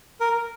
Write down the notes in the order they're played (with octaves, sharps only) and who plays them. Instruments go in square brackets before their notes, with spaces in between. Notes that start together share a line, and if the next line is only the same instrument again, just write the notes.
[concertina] A#4